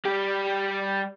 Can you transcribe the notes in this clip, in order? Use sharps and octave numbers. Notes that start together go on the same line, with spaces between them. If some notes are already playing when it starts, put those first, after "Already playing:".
G3 G4